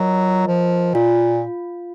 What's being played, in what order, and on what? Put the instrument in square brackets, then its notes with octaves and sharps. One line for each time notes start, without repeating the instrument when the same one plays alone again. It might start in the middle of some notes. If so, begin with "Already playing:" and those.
Already playing: [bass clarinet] F#3 [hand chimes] F4 A#4 D#5
[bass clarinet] F3
[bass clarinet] A#2 [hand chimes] F4